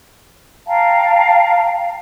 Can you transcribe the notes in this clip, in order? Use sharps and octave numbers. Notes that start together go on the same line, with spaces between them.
F5 G5 A5 A#5